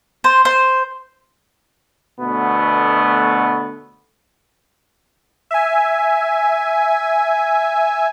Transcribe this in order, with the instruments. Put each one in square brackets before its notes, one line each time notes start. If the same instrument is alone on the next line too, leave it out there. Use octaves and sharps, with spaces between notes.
[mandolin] C5
C5
[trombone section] D2 B2 A3 B3
[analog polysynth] E5 G#5